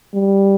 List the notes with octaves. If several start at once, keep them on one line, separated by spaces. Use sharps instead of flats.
G3